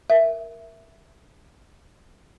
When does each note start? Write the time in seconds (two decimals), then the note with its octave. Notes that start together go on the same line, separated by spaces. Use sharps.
0.10 A#4 E5